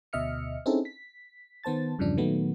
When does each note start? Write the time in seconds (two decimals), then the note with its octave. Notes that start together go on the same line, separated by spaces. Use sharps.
0.13 D2 B2 D#5 E5 F6 C#7
0.66 C4 C#4 D#4 E4 G#4 A4
0.85 B6
1.64 D#3 B3 C5 A5 A6
1.99 E2 G2 C#3 F3 D4
2.17 A#2 D#3 F#3 A3 B3